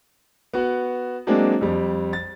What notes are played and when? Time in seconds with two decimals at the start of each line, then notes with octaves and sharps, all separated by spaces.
0.53 B3 F#4
1.27 F#3 G#3 A#3 C4 D4
1.61 F2 G3
2.13 A6